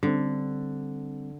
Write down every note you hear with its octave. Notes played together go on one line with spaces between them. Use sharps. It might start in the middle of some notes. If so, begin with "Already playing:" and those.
D3 G3 C4